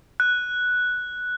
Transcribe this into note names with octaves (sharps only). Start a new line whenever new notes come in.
F#6